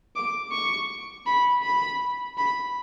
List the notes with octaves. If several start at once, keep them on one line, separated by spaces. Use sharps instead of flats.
D6
C#6
B5
B5
B5